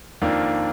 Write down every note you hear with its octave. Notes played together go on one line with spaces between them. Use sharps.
F2 D#3 A#3 D4 F4